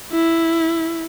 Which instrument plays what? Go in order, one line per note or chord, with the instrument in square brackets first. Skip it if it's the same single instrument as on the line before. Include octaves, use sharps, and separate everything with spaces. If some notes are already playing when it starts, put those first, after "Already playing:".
[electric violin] E4